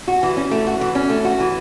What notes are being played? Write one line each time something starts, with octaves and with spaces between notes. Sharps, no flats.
F#4
E3
C#4
A3
F#4
E3
C#4
A3
F#4
E3